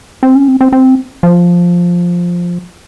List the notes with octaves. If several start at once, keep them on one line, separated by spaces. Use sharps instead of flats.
C4
C#4
C4
C4
C4
F3